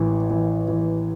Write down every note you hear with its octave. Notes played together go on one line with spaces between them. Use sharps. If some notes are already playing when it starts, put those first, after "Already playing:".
Already playing: A1 E3
E3
E3